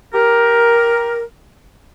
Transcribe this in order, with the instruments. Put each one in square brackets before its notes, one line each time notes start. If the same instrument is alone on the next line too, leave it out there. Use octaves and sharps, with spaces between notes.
[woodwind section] G4 A#4